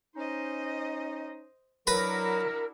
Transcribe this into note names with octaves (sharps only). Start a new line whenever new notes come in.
C#4 D#4 C5 D#5
F#3 D4 E4 F#4 A#4 B4 A#5 B5